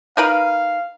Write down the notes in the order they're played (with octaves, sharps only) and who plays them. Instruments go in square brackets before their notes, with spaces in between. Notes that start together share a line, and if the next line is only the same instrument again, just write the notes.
[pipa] D#4 A#4 B4 [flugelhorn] F5